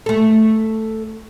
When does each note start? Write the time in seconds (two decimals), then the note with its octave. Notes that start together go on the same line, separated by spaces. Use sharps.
0.06 A3 A4